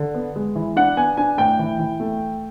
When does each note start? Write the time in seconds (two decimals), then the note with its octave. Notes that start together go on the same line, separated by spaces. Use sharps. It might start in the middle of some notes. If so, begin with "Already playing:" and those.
Already playing: D3
0.14 B3
0.36 G#3
0.56 E3
0.76 D4 F#5
0.96 B3 G#5
1.17 D4 G#5
1.38 A2 G5
1.59 E3
1.79 E3
2.00 A3